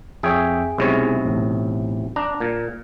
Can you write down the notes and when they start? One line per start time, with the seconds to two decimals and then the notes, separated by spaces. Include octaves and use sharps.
0.23 F2 G#4 C#5 E5 G5
0.78 B1 C3 G#3 C#4 E4 C#5
1.25 A1 A2
2.16 D4 A#5
2.40 A#2